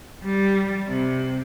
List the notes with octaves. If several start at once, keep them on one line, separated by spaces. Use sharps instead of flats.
G3
C3